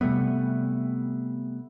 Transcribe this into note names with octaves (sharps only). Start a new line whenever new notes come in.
C3 G3 A3 B3